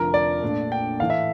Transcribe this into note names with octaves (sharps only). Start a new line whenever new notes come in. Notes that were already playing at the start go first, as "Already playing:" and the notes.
Already playing: F1 F2 D3 F3 A#4
D5
A#1 A#2 A3 D4
G5
A2 E3 A3 F5
E5